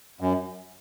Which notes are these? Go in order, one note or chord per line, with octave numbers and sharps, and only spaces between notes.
F#2